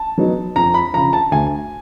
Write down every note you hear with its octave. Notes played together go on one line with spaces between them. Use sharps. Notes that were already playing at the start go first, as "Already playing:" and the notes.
Already playing: A5
F#3 B3 D#4
F2 A#5
B5
C#3 F3 A#5
A5
D2 G#5